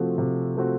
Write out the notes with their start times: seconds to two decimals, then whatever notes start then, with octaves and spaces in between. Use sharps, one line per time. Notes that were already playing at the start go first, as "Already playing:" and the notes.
Already playing: C3 F3 A3 C4 F#4
0.18 C3
0.55 F3 A3 C4 F#4